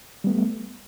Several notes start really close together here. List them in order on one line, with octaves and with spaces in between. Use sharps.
G3 B3 A3